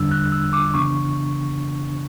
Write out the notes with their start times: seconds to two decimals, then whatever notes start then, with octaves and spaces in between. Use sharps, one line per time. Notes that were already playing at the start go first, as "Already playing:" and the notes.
Already playing: E2 D3 G3 D4 E6
0.11 F#6
0.32 E6
0.53 D6
0.74 C#3 E3 B3 D4 C#6